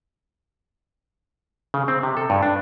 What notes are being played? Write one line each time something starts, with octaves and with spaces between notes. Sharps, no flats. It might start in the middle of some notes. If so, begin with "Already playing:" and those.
C#3
C4
C3
A4
G2
D4